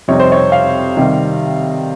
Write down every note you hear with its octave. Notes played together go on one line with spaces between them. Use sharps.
F2 C3 G3 C4 D#4 C#5
C5
C#5
F5
C3 D#3 G3 C4